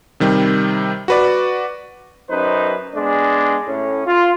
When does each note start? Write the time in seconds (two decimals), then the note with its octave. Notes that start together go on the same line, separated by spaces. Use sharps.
0.20 C3 D#3 G3
1.08 F#4 B4 D5
2.29 F#2 D#4 B4 C5
2.94 G#3 B3 D4
3.66 A2 C#4
4.06 F4